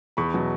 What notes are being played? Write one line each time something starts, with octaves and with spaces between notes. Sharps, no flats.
E2 B5 C#6
B2 F#3